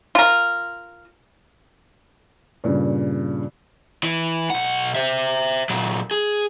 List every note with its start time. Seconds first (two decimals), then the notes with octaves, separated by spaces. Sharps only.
0.15 F4 A#4
2.64 G2 A#2 C#3
4.03 E3
4.50 B1 F#5
4.95 C5 E5
5.70 A#2 F#3
6.11 G#4